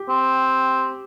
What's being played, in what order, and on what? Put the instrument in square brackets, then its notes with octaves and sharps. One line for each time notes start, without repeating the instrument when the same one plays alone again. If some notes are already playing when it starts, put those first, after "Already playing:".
Already playing: [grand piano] G4
[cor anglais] C4